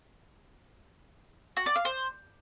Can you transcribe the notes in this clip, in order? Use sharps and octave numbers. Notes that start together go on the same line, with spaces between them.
F#4
D5
F5
C5